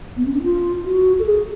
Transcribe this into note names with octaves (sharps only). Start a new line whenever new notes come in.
B3
C#4
D4
F4
F#4
A4
G#4